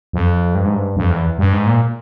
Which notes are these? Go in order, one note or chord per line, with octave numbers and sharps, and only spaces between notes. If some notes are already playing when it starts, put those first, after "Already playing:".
F2
G2
G#2
G2
F2
E2
G2
G#2
A#2